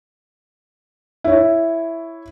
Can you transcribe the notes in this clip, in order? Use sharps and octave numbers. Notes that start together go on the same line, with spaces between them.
E4 C#5